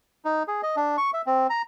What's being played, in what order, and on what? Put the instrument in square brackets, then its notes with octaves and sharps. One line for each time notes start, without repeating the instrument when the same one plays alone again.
[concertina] D#4
G#4
D#5
D4
C#6
E5
C4
A#5